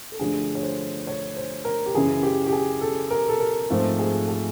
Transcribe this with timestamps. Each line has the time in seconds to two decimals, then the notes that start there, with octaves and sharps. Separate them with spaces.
0.12 A4
0.19 G2 D3 F3 A3 D4 G#4
0.55 C#5
0.63 C5
1.07 C#5
1.36 C5
1.65 A#4
1.86 G4
1.94 F#2 C#3 E3 G#4
2.23 G4
2.46 G4
2.53 G#4
2.81 A4
3.11 A#4
3.29 A4
3.40 A#4
3.70 G#2 F3 A3 C4
3.99 G#4
4.28 G#4